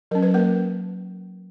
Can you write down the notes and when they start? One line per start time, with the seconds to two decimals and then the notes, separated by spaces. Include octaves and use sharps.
0.11 F#3 C#4 A#4
0.23 B4
0.34 A#3 A#4